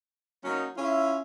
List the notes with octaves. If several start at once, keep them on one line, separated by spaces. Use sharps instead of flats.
F#3 A#3 C#4 D#4
C#4 E4 F4 E5